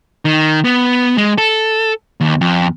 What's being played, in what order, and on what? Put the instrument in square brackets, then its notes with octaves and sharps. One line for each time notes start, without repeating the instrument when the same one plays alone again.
[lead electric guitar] D#3
B3
G#3
A4
D#2
F2